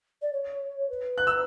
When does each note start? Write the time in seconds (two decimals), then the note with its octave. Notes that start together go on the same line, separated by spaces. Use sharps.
0.21 D5
0.33 C#5
0.89 B4
1.18 F#6
1.27 E6